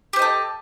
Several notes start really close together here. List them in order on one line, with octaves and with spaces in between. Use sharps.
G4 C5 D#5 A4